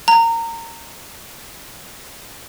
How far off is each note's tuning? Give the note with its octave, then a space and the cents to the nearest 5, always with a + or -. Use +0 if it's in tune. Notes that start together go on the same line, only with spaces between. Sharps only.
A#5 -25